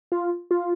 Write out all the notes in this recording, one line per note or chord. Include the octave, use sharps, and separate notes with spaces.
F4
F4